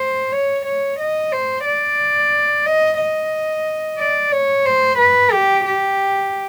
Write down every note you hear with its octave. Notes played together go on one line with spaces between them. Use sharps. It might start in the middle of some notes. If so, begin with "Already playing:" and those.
Already playing: C5
C#5
C#5
D#5
C5
D5
D#5
D#5
D5
C#5
C5
B4
G4
G4